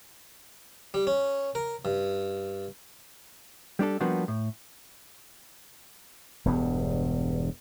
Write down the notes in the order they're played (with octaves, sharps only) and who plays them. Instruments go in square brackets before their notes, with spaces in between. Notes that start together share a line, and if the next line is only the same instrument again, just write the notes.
[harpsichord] G3
C#4
A#4
G2
[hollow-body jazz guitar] G3 D4 G4 A4
F3 G3 A#3 B3 D4 F#4
A2
[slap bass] E1 E2 G2 B3